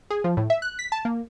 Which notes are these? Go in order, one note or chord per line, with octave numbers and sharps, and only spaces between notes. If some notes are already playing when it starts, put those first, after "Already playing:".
G#4
F3
A2
E5
F#6
B6
A5
A#3